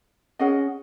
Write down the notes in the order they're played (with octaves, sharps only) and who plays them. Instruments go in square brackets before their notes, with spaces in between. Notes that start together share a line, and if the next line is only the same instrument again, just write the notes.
[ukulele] C#4 G#4 D#5 F#5